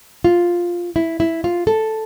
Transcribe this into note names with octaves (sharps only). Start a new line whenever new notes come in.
F4
E4
E4
F4
A4